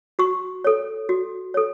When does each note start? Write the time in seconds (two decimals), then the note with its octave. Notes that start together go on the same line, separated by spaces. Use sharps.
0.19 F#4 C#6
0.64 A4 C#5
1.09 F#4
1.54 A4 C#5